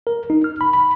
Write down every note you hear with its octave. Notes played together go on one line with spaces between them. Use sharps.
A#4
D#4
F6
B5
B5